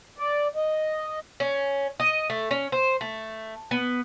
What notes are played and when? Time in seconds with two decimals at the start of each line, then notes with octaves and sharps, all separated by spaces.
0.18 D5
0.56 D#5
1.40 C#4
2.00 D#5
2.30 A3
2.51 C#4
2.72 C5
3.01 A3
3.71 B3